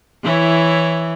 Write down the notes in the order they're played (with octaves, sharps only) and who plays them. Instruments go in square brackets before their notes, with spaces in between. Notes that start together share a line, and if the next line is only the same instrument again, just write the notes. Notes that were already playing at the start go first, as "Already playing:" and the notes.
[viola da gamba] E3 [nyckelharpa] E4 C#5